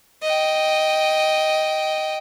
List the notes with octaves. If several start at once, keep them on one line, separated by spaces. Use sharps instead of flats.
D#5 G5